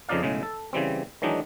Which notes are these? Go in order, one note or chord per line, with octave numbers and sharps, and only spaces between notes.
F2 C#3 F3 D#4 D5 F5
B1 A2 C#3 G#3
A4
C#3 E3 G3 C4
D#3 E3 F#3 G#3 D4 D#4